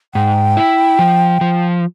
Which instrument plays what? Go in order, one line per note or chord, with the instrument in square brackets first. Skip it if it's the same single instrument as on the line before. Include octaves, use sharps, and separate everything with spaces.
[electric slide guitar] G#2 [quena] G5
[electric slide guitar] E4
F3
F3